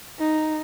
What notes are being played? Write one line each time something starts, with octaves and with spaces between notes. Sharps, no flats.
D#4